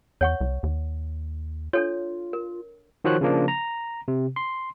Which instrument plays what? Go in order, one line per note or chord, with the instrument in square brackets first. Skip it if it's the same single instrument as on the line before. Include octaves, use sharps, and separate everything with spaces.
[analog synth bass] E2 [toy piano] C#5 F#5 C#6
[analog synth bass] C2
D#2
[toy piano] D4 A4 C#5 [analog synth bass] F4
[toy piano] A#4
[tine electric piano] D#3 F3 F#4 C5 C#5 F#6
C#3 F3 A#3 D4
A#5
C3
C6